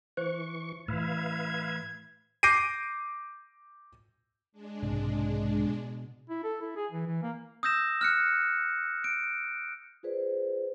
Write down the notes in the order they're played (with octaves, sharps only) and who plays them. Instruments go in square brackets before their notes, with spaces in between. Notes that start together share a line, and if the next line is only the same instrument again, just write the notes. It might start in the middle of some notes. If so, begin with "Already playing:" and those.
[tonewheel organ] E3 C#6 [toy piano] C5
[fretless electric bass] A2 E3 [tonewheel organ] B4 E5 F5 [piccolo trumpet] G#6
[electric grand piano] D6 G6 A#6 C7 D7 D#7
[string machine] G#3 D4
[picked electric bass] B1 G#2 C3
B2
[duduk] E4
A4
E4
G#4
E3
E3
A#3
[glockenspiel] D#6 E6 G6 A#6 E7
F6 F#6 C#7
D7
[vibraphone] F4 G#4 B4 C5 D5